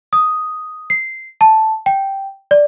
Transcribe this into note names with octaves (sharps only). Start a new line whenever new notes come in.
D#6
C7
A5
G5
D5